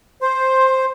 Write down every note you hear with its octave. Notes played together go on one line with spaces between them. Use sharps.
C5 C6